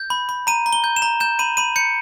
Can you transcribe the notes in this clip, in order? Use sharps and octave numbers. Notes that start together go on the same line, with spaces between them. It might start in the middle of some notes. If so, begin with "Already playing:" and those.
Already playing: G6
B5
B5
A#5 D#7
A#5
G7
G6
E7
A#5
G6 E7
B5 D#7
B5 D#7
G6 C#7